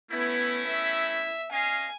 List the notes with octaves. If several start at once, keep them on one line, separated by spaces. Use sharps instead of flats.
A3 B3 C#4 E4
E5
C#4 D#5 F5 G#5